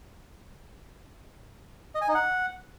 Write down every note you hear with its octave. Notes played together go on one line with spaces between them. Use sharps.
D#5
G#5
D#4
F#5